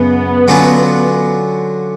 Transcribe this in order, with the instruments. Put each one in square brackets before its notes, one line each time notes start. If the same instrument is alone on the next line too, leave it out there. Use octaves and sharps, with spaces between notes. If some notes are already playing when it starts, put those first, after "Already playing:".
Already playing: [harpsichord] F#2 C#3 [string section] B3
[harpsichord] D3 F#3 C#4 F4